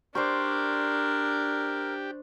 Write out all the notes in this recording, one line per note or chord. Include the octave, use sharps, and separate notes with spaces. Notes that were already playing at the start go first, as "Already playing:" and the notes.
D4 G4 A#4 C5 D5 C#6